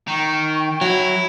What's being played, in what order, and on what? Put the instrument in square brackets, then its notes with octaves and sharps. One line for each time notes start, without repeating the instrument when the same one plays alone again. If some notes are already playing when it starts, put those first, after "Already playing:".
[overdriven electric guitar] D#3 [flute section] G5 C#6
[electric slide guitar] F#3 [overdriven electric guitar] E4